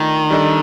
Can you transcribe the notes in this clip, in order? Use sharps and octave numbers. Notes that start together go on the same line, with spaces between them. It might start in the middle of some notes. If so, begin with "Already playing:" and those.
Already playing: D#3 A3 D4 F4
G3 D4 A4 D#5